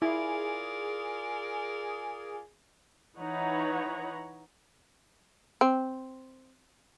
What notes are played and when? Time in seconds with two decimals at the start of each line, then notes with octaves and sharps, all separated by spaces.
0.02 E4 F4 G#4 A#4 D5
3.16 E3 D#4 C#5 F#5 A#5 B5
5.61 C4